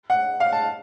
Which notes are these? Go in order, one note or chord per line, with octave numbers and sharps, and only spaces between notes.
F#5
F5
A5